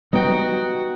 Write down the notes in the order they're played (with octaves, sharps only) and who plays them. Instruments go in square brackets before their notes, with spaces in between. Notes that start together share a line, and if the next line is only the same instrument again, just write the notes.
[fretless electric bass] G3 B3 [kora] D#4 G5 [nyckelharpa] F#4